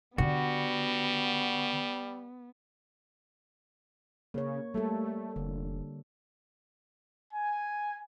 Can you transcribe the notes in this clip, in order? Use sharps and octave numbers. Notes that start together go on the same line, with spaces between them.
D3 G3 B3 F#4
C#3 A#3 C#5
G3 A3 A#3 A4
F1 D3
G#5